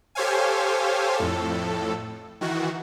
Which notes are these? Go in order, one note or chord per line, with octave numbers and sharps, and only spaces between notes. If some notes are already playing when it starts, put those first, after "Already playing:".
G4 A4 C5 C#5 F5 G#5
F2 A2 A4
D#3 E3 F#4